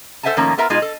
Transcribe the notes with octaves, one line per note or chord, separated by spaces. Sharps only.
A4 C5 E5 F#5 G#5 A5
A2 D#3 F3 A#3 C#4 A#5
B3 F4 A#4 E5 A#5
B2 G#3 D#4 F4 G#4
A4